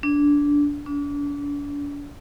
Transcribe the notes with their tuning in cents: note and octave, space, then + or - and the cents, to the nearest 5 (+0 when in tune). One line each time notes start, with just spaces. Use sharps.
D4 -15
D4 -40